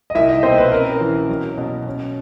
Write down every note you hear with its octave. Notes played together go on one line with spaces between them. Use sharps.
D#5
C2 E4 E5
D#4 D#5
B2 C4 C5
B4
C#4 A#4
E3
F#3
B2
C#4